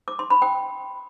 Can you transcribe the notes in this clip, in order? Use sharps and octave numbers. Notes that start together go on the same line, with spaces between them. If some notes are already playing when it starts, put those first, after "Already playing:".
D6
C6
B5
G5